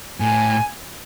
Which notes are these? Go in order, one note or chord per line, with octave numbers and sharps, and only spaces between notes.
A2 G#5